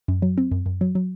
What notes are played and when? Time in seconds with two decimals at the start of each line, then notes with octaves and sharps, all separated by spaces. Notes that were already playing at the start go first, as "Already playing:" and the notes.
0.08 F#2
0.22 F#3
0.38 C4
0.51 F#2
0.66 F#2
0.81 F#3
0.95 F#3